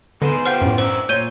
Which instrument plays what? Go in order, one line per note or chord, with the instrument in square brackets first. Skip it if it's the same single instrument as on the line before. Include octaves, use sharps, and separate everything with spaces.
[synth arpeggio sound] D3 [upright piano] B3 [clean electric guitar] D#4 G#4 C5
[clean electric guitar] F4 G4 [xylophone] C5 F#5 G6 [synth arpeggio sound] F6
[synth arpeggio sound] F#2 A2
[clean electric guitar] D4 A#4 E5 [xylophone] C5
[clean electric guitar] A#2 [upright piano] C5 C#5 [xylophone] G6 D#7 G7